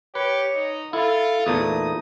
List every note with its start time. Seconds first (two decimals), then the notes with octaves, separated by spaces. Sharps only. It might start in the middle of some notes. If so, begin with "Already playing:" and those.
0.15 G4 B4 C#5
0.55 D#4
0.93 E4 F4 A4
1.47 E2 A#2 A3 D#4 D#6